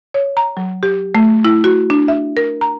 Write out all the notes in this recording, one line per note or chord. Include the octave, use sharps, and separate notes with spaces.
C#5
A#5
F#3
G4
A3
E4
F#4
D4
E5
A#4
A#5